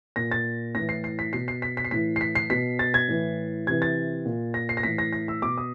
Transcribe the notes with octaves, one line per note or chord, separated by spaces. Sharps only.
A#2 A#6
A6
A2 E3 A#6
C7
C7
B6
B2 C7
C7
B6
B6
C7
A2 E3 B6
C7
B6
C7
B2 B6
A6
G#6
A2 E3
C3 E3 G#6
A6
A#2
A#6
C7
A#6
A2 E3 B6
A#6
A#6
E6
B2 D6
D#6